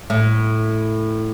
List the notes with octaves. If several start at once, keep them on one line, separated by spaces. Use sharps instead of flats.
A2